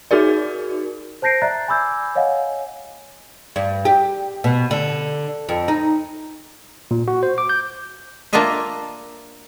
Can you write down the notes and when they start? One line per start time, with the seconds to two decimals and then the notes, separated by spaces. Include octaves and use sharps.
0.11 D#4 F#4 G#4 A#4 D5
1.22 C5 A5 G6 A#6 C7 D7
1.42 D5 E5 A#5 F#6 A6
1.68 G#5 B5 D6 E6 G6 G#6
2.15 C#5 D#5 F5 F#5 G#5
3.56 G2
3.85 G4
4.44 B2
4.71 D3
5.49 F2
5.68 D#4
6.91 A#2
7.08 F#4
7.23 C5
7.38 D6
7.49 G6
8.33 A#3 D4 F4 A#4 D#5 E5